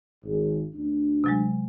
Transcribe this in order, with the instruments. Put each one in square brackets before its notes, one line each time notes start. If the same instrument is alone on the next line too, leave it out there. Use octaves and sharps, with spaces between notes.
[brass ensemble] G#1
D2 D4
[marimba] C3 F#3 G#3